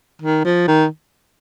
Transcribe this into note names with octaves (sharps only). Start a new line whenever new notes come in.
D#3
F3
D#3